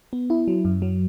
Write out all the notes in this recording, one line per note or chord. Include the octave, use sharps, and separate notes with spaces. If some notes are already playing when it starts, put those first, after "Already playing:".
B3
E4
F#3
F#2
F#3